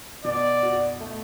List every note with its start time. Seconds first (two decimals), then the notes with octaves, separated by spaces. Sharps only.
0.25 B2 D5
0.63 F#4
1.00 A3